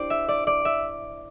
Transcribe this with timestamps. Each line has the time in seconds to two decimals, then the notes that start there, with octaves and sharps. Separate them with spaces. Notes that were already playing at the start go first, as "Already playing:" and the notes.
Already playing: D4 E4 G4 C5 D5
0.10 E5
0.28 D5
0.47 D5
0.65 E5